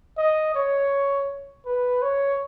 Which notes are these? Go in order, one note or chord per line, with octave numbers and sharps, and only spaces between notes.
D#5
C#5
B4
C#5